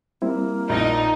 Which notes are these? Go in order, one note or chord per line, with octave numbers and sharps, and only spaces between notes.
G3 A#3 C4 E4
A#1 D#4